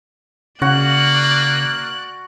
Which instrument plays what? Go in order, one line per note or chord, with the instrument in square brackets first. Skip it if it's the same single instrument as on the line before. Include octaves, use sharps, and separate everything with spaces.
[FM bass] C#3 [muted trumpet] A#3 [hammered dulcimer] F#4 [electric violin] D5 F#6